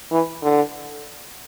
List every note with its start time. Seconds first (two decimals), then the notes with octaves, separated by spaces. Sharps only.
0.12 E3
0.42 D3